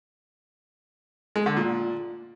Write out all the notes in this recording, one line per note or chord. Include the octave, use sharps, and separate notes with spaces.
G#3
D3
A#2